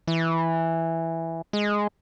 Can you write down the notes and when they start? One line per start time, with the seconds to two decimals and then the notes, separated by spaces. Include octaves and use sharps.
0.07 E3
1.53 G#3